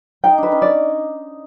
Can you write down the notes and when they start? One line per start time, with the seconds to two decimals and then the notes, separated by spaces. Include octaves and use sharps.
0.24 D#4 G5
0.38 D4 B4
0.52 C#4 D#4
0.62 D5